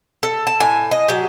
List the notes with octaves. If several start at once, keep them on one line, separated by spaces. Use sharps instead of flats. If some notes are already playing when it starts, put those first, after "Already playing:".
A4
A5
A2 G#5
D#5
F#3 G4